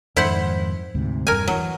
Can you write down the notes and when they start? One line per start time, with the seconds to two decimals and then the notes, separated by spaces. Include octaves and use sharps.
0.16 F2 G#2 D#3 E4 C5 F#5
0.95 D2 G#2 C3
1.27 E1 G2 A#4 G#5
1.48 E3 F#3